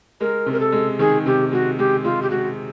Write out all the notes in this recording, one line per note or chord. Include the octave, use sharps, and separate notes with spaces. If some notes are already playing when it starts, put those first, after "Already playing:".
G#3 A#4
C3
A#4
A4
G#3
D#3 G#4
C3 G4
G#3 F#4
G#3 G4
G#3 F4
G4
G#3 F#4